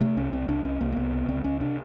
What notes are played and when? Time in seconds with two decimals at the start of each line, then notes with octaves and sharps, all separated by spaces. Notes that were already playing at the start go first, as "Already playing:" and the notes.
0.01 C3 A3
0.17 C2 C#4
0.32 C2 C4
0.48 C2 D4
0.64 C2 C#4
0.81 C2 A#3
0.92 A#3
0.97 C2 B3
1.13 C3
1.29 C#2 C4
1.44 C#2 C#4
1.61 C3 D4